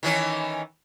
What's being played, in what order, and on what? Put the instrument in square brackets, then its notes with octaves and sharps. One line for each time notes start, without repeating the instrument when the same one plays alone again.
[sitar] D#3 E3 C#4